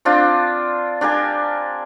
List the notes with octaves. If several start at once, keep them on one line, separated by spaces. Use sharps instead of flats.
C4 D4 F4
D4 G4 A#4 G#5